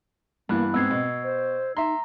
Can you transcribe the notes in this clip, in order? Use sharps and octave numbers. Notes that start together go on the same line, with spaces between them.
G2 E3 A#3 B3 B5 F#6
G#2 B3 C4 E6 G#6 C7
B2
C5
D#4 E5 A#5 C6